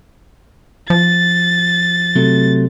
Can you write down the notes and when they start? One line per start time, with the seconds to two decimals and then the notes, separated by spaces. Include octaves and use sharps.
0.90 F3 A6
2.16 C3 F#3 A3